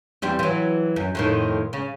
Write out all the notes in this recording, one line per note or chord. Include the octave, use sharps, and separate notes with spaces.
E2 G3 C4
E3 F#3
F#2
F2 A2 D#3
C#3